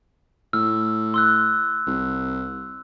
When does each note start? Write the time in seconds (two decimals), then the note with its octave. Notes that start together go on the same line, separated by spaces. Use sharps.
0.53 A2 E6 F6
1.14 C6 E6 F#6
1.87 C2